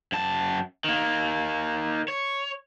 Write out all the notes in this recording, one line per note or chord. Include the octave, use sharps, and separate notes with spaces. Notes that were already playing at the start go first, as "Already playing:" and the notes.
F#2 A5
D#3 A#3
C#5